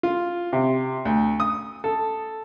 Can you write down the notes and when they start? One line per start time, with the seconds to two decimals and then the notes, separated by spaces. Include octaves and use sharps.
0.03 F4
0.53 C3
1.05 D2
1.40 D#6
1.84 A4